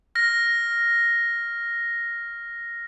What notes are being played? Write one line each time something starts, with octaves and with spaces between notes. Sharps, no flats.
F6 A#6